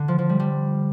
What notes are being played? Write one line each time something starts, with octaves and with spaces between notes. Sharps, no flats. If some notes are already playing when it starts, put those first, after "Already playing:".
Already playing: D3
F3
F3
G3
G3